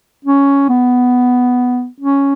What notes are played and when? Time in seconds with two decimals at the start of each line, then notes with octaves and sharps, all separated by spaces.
0.25 C#4
0.69 B3
2.00 C#4